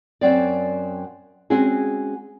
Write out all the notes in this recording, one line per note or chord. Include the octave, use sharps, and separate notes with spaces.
F#2 F#3 C4 D5
G#3 C4 C#4 F#4 G#4